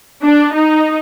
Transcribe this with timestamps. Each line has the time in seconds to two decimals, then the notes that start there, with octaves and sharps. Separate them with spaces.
0.22 D4
0.53 D#4